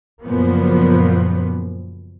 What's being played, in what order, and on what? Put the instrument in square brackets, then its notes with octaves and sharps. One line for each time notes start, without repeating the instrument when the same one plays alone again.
[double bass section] F#2 A#2 C#3 F3 A#3 B3